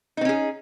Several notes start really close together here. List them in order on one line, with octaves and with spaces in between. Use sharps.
D#4 C4 C#4 G#4